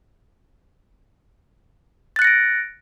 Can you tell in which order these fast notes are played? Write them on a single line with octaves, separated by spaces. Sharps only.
A6 F#6 C#7 A#6 D7